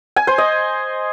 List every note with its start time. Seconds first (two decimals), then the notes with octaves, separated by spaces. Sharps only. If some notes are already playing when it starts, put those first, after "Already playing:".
0.16 G#5
0.27 C5
0.38 D#5